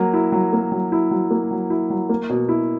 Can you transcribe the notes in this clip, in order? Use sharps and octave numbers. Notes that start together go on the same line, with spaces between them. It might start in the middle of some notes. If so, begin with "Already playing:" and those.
Already playing: F#3 A#3
E4
F#3
A#3
F#3
E4
F#3
A#3
F#3
E4
F#3
A#3
B2
E4